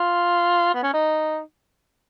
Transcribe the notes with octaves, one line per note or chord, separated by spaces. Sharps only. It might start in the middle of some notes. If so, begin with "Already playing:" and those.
Already playing: F4
B3
C#4
D#4